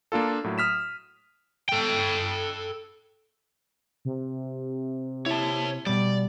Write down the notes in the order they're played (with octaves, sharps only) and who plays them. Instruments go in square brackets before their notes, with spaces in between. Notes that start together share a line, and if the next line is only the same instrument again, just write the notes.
[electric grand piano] A#3 D4 F4 A4
A2 F#3
D#6 F6 B6 E7
[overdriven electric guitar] A4 G5
[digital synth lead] C3
[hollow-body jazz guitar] E4 [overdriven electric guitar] C#5 A5
[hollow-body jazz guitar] B2 G3 [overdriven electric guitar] D5